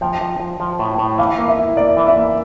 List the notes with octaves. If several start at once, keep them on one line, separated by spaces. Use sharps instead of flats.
F3 G5
F3
F3
F3
A2
A2
E3 F5
A#3
E5
E4
A#3 D5
E3
E5
A#3